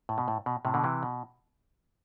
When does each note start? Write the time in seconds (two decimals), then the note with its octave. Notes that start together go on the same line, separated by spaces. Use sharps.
0.09 A2
0.18 B2
0.28 A2
0.46 B2
0.65 A2 C3
0.74 B2 D3
0.84 C3 E3
1.03 B2